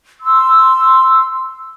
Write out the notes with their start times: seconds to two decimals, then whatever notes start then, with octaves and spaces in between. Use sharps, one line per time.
0.21 C6 E6